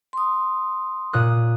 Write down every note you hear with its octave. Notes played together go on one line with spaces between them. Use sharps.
C6 D#6
A#2 D#6 F#6